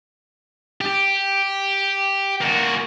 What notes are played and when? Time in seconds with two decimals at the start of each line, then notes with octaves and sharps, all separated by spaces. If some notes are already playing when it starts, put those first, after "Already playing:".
0.81 G4
2.41 A#3 F#4